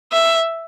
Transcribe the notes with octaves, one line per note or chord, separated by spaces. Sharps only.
E5